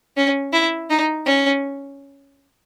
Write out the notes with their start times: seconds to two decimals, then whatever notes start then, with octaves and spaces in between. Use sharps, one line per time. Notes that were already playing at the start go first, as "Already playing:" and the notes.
0.17 C#4
0.53 E4
0.90 D#4
1.26 C#4